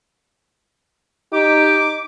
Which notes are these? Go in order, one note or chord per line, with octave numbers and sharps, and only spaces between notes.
D#4 G4 D6